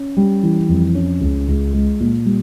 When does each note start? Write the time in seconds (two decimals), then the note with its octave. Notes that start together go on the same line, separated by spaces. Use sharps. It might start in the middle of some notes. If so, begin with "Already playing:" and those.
Already playing: C#4
0.17 G3
0.43 E3
0.69 F2
0.95 C#4
1.21 C#2
1.48 C#2
1.73 G#3
2.00 A#2
2.26 G3